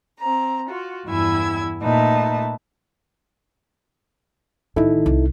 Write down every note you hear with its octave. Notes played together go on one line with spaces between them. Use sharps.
C4 A#5
F4 F#4
E2 G2 E4 G#5 E6 G#6
A#2 A3 D#4 B4 E5 A5
A1 D#3 D#4 E4 A4
C2 C#4